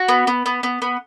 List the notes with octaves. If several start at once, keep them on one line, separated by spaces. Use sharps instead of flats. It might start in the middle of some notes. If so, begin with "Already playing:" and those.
Already playing: F#4
B3
B3
B3
B3
B3